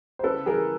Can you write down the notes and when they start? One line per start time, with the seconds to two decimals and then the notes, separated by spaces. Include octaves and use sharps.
0.19 C5
0.23 C#3 A4 B4
0.46 E3 G#4 A#4